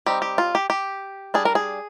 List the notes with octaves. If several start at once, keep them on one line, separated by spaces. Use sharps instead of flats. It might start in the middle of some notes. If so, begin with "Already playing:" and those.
G3 C4 D#4 G4
G4
F4
G4
G4
G3 D4 G#4
A#4
G#4